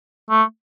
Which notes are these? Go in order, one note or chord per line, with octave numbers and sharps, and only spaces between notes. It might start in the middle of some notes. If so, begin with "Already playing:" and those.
A3